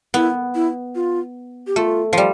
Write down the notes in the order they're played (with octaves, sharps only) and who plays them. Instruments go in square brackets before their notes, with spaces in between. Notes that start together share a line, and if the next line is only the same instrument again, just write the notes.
[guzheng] B3 [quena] E4
[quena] E4
F4
G4
[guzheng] A3 [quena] F4
[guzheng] F3 G3